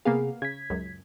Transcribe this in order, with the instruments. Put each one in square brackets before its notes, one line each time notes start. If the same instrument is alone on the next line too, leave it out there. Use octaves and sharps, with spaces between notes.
[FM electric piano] C3 G#4 [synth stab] A#3 B3 F5
[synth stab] C#3 [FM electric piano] G#6 B6
[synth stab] C#2 F#2